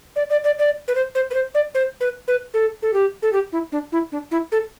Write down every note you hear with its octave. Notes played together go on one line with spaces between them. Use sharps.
D5
D5
D5
D5
B4
C5
C5
B4
C5
D5
C5
B4
B4
A4
A4
G4
A4
G4
E4
D4
E4
D4
E4
A4